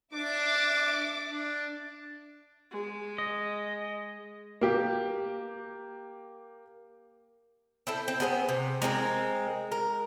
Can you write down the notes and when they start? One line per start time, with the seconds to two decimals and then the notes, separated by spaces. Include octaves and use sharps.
0.14 D4 E5 D6
1.30 D4
2.71 G#3
3.18 D#5
4.61 A#3 G4
7.87 C4 E4 A4
8.08 C4
8.20 B3 G#4 A4 C5
8.49 C3
8.82 G#3 C4 E4 A#4
9.72 A#4